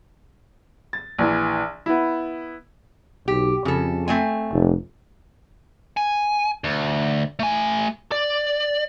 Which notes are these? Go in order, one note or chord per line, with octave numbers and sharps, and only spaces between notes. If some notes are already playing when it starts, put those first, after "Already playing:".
A6
A#1 E3
B3 E4
B1 G4
F2 C#3 A4
A3 C4 G#5
F1
G#5
D2
A3 G#5
D5